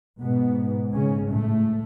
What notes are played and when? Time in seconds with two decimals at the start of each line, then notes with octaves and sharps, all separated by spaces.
0.20 G#2 B2 B3
0.93 C#3 C#4
1.31 A2 A3